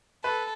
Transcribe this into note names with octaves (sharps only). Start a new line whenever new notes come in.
A4 B4